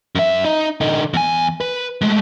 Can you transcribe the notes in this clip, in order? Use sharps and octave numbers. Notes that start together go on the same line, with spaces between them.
F#2 E5
D#4
D3 D#4
E2 G#5
B4
G#3 A3